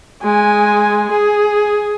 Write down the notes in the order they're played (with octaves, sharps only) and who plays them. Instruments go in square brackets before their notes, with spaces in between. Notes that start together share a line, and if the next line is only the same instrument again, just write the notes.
[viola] G#3 G#5
G#4